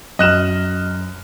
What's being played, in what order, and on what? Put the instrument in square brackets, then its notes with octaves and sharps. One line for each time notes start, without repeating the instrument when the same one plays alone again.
[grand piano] F#2 F6 [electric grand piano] D#5 F#6 E7